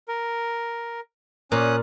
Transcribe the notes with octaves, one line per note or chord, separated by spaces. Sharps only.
A#4
A#2 C#4 D#6 F#6